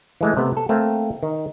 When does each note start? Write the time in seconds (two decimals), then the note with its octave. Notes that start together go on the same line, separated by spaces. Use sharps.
0.21 E3 G#3 A3
0.37 C3 A3 B3
0.57 A4
0.69 A3 A#3 C4
1.23 D#3